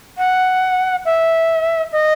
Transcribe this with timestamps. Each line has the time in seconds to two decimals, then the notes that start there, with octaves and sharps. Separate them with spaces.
0.18 F#5
1.05 E5
1.92 D#5